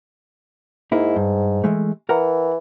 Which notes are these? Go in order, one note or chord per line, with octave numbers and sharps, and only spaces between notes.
G#2 A#3 D#4 E4
G2
E3 G#3 A3
E3 A#4 F#5 A#5